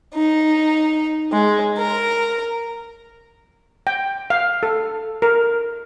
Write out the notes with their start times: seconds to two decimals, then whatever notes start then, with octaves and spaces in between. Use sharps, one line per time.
0.14 D#4
1.32 G#3
1.77 A#4
3.87 G5
4.30 F5
4.63 A4
5.22 A#4